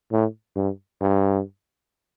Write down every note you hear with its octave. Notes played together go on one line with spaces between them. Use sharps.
A2
G2
G2